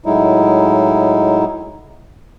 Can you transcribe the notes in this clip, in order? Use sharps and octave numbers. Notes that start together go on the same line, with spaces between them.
A2 F#3 G#3 D#4 E4